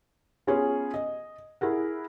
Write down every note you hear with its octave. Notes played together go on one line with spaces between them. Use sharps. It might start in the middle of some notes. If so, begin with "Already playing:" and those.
B3 C#4 F4 G#4 C#5
D#5
E4 G#4 A#4 F#5